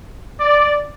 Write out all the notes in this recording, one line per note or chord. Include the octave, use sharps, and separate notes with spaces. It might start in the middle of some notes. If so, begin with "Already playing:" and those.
D5